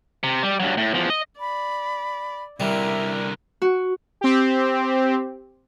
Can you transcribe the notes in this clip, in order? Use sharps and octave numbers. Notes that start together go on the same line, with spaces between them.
C3
G3
G2 F#3
A2
E2 F3
D#5
D5 B5
C2 D3 G3 E4 A#4 E5
F#4
C4 G4